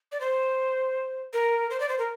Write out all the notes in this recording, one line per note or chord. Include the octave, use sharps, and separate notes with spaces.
D5
C5
A#4
C5
D5
C5
A#4